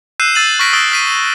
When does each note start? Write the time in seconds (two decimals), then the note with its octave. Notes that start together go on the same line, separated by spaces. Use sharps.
0.20 E6 F#6 G6 C7 D#7 E7
0.35 E6 A6 D#7 F#7
0.59 C#6 F6 A#6 B6 D7
0.73 D#6 E6 A6 D7 D#7 G7
0.92 F6 B6 D#7